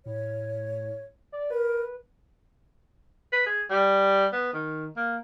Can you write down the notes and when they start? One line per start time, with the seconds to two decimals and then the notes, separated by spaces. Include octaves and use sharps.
0.06 A2 C#5
1.32 D5
1.50 A#4 B4
3.32 B4
3.46 G#4
3.70 G3
4.33 B3
4.53 D#3
4.96 A#3